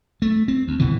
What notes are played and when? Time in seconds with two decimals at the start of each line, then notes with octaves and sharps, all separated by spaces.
0.22 A3
0.48 C4
0.67 D2
0.79 D#1 B2 D3 E3